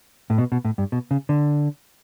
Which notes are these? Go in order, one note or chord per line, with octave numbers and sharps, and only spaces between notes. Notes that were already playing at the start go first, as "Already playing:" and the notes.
A2
B2
B2
A2
G2
B2
C#3
D3